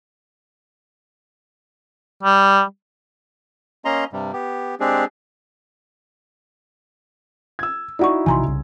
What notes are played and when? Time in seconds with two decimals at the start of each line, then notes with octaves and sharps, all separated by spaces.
2.23 G3
3.85 A#3 C#4 D#5 A#5 C6
4.13 G2 C3 G3
4.33 B3 G4
4.80 G#3 C4 D4 G4 G#4
7.59 E6 G#6
7.99 D#4 E4 F#4 D5 F#5 C#6
8.26 A#1 C3 E3 G#5 A#5 C6
8.44 C2 C#3